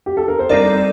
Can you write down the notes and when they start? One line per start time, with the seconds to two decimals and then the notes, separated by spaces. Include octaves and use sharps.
0.06 G4
0.17 A4
0.28 A#4
0.39 C5
0.49 G3 C4 D#4 A4 A#4 D5